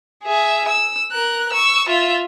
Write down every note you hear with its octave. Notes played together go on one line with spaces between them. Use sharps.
G#4 E5
E6
A#4 F#6
C#6 E6
F4 E5